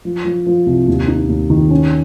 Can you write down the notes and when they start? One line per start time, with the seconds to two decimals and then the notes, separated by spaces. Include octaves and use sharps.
0.05 F3
0.25 F3
0.46 F3
0.66 C2
0.88 D#2
1.08 D#4
1.29 D#2
1.50 D#3
1.70 C#4